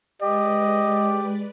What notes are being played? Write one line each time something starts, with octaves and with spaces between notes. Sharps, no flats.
G#3 G4 B4 D5 D#5